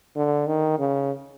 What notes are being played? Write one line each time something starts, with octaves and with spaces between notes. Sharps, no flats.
D3
D#3
C#3